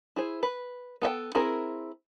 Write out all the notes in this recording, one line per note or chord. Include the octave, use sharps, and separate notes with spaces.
E4 G#4 C5
B4
B3 A4 E5 G5
C4 E4 G#4 A#4